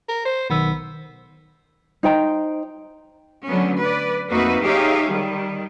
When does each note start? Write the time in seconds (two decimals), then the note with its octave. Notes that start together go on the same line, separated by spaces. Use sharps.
0.08 A#4
0.25 C5
0.50 B1 D#3 B3 E6
2.03 D#4 C5 G5 A#5
3.47 D3 F#3 A3 B3 C#4
3.81 B4 D5
4.30 F2 A#3 D#4 F#4 B4 E5
4.63 D#4 G4 G#4 C#5 E5 F5
5.08 D#3 G3